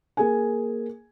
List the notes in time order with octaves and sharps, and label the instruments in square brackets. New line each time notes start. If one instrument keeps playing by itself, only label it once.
[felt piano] A#3 G#4 G#5